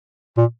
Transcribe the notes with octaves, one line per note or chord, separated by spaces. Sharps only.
A#2